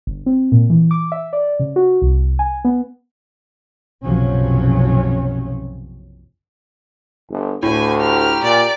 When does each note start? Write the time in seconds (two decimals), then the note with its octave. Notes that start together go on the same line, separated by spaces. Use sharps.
0.07 G1
0.26 C4
0.52 A#2
0.70 E3
0.91 D6
1.12 E5
1.33 D5
1.60 C#3
1.76 F#4
2.02 C2
2.39 G#5
2.65 B3
4.04 F#1 B1 C3 F3 F#3 C#4
7.30 G1
7.63 D2 A2 G#5
8.00 G4 A#5 F6
8.43 A#2 D5